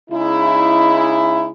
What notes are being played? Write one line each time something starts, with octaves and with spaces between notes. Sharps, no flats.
C#3 G#3 D#4 E4